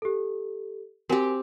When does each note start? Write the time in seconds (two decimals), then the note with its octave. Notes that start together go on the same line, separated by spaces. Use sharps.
0.02 G4 A4
1.10 C4 F#4 G4 A#4 G#5